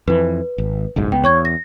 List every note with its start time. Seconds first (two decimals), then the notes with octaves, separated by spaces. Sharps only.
0.08 F2 E3 B4
0.58 G#1
0.96 F#1 B1 G#2
1.12 C#2 B3 G5
1.24 E2 C#5 C#6 G#6
1.45 A#6